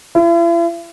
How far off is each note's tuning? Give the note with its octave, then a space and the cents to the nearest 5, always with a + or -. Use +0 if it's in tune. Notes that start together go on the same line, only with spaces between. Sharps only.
E4 +45